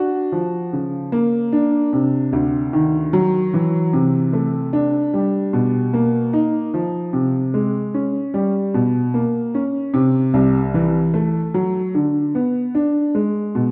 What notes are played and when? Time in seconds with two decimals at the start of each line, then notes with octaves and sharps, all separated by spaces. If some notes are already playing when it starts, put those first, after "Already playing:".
Already playing: D4 F#4
0.32 F3
0.73 C#3
1.12 A#3
1.53 D4
1.93 C3
2.33 D2
2.73 D#3
3.13 F#3
3.54 E3
3.93 C3
4.33 A3
4.73 D4
5.14 G3
5.53 B2
5.94 A#3
6.33 D#4
6.74 F3
7.13 C3
7.54 G#3
7.94 C#4
8.34 G3
8.74 B2
9.14 A#3
9.55 C#4
9.94 C3
10.34 C2
10.74 E3
11.14 A3
11.54 F#3
11.95 D3
12.35 B3
12.75 D4
13.15 G#3
13.55 B2